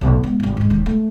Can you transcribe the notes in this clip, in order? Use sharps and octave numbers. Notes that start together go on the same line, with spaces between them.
B1 A2
G#3 B3
G#1 G3
G#2 G#3
D#1 D#2
A3